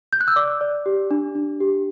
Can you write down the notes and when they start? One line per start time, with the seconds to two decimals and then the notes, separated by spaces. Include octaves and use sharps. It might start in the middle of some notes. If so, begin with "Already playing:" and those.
0.13 G6
0.21 F#6
0.28 E6
0.36 D5 D6
0.61 D5
0.86 G4
1.11 D4
1.35 D4
1.60 G4